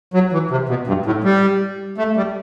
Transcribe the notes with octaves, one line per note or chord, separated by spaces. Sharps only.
F#3
E3
C3
B2
G2
A2
G3
A3
G3